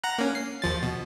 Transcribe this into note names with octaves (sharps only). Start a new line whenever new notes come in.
F#5 A#5 F#6
A#3 C#4
C7
D#2 F3 A6
B2